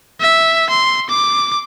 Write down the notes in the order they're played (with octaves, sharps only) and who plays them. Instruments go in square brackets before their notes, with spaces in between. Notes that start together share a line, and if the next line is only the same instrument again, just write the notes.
[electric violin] E5
C6
D6